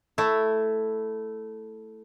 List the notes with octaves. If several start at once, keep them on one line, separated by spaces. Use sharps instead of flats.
A3 E4